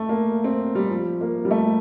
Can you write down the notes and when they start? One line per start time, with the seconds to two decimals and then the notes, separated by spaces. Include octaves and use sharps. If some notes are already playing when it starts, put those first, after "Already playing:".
Already playing: A3
0.09 A#3
0.44 C4
0.75 G3
0.90 F3
1.21 A#3
1.45 G3
1.51 A3